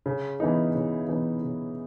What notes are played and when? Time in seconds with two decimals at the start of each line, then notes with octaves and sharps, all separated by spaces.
0.06 C#3
0.40 E3 B3 D#4
0.74 C#3
1.08 E3 B3 D#4
1.43 C#3